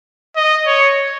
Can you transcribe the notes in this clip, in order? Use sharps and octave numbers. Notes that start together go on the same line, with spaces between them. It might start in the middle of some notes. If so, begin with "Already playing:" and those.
D#5
C#5